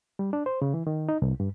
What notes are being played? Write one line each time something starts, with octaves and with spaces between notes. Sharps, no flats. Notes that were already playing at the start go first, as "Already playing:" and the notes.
G3
D4
C5
C#3
E3
D#3
D#4
C2
G2